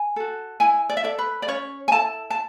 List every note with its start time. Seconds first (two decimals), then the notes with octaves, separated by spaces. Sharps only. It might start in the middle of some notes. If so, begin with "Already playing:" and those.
Already playing: G#5
0.16 F#4 A4
0.60 E4 G#5
0.89 D5
0.97 E5
1.04 A4 D5
1.19 B4
1.42 D5
1.48 C#4 C#5
1.88 G#5
1.92 E4 A4 A5
2.30 A5